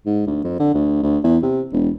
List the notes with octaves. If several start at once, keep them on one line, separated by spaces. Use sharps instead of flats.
G#2
D2
F2
D3
D2
D2
E2
C3
E1